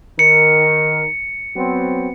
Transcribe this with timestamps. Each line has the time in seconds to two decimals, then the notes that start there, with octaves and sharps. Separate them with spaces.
0.19 D#3 A#4 C#7
1.56 F#3 B3 C4